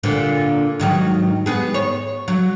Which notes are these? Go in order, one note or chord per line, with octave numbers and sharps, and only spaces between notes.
A#2 D3
G#2 D#3 F#3
G#2 B3 G#4
C#5
F#3